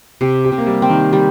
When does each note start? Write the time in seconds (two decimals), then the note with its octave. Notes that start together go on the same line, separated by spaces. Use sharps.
0.21 C3 G4
0.45 G4
0.52 C3
0.58 A#3
0.67 G3
0.82 C4
0.90 D#3
1.13 G3